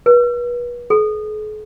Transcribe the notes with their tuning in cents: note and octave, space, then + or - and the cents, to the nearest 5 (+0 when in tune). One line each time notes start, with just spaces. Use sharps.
B4 -35
G#4 +45